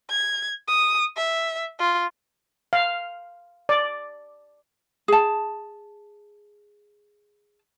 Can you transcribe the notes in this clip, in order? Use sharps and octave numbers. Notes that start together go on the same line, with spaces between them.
G#6
D#6
E5
F4
F5
D5
G#4 A5